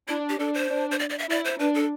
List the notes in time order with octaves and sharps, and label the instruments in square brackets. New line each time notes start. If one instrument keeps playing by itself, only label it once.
[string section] D4 [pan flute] E4
[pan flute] G4
[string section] D4 [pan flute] A4
[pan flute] C5
[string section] D4
[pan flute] C5
D5
D5
E5
[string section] E4 [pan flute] D5
[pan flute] C5
[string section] D4 [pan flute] B4
[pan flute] A4